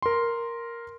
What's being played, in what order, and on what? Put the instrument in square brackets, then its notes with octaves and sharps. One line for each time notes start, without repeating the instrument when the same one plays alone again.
[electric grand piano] A#4 C6